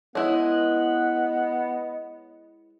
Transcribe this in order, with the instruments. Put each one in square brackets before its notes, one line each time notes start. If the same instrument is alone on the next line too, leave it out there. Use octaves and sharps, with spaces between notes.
[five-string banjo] G#3 E4 [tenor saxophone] B3 [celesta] C#5 [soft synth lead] D#5